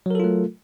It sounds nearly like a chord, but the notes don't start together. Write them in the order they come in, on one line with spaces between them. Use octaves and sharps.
F#3 A#4 A4 F4 A3